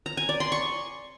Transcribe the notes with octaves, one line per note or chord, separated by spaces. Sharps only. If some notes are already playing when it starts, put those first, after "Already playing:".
A#5
G#5
D5
C6
C#6